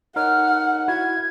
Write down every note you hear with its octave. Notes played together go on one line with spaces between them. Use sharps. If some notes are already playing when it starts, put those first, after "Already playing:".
D#4 A#4 C#5 F#5 F6
E4 F#4 G#6